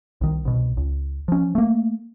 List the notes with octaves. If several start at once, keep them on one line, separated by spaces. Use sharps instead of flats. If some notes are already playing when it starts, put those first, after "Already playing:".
C2 D#3
C2 B2
C#2
F3 C#4
A3 A#3